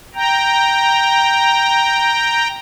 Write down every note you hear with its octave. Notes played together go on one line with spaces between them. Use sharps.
G5 A#5